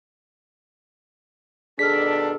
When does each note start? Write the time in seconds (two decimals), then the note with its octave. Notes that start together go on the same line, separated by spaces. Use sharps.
1.79 B2 D#3 D4 G#4 A4 F6 B6